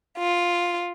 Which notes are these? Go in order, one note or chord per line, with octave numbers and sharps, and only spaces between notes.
F4